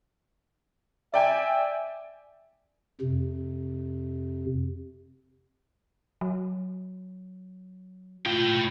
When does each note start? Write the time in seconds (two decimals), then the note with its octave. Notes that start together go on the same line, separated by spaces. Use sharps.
1.14 D5 E5 G5 G#5
3.01 F2 C3
6.21 F#3
8.26 A2 F4 G5